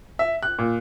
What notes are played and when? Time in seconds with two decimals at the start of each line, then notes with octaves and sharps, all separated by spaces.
0.19 E5
0.43 F#6
0.59 A#2